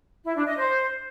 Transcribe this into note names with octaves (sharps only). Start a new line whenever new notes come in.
E4
D4
D#5
C5